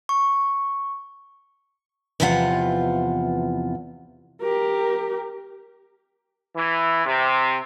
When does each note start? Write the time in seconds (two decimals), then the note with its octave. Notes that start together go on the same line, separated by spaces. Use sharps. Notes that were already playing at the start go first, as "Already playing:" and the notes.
0.09 C#6
2.20 E2 C3 E3 F3 F4 F#5
4.41 G4 A#4
6.56 E3
7.06 C3